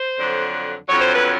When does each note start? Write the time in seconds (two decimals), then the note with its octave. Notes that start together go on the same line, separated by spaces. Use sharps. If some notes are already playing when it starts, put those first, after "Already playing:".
Already playing: C5
0.18 F2 D3 F#3
0.88 F2 D3 F#3 C#5
1.01 C5
1.15 B4